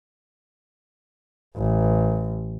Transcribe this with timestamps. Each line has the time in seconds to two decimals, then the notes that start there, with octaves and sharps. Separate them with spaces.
1.57 A1